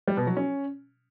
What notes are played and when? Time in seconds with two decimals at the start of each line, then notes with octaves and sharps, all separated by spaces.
0.08 G3
0.17 B2
0.27 F#3
0.37 C#4